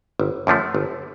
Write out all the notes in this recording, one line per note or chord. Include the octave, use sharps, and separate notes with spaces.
G1
F#2 D3 F3 A3
G1